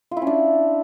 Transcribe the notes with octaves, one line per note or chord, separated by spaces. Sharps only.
F4
E4
C#4
D4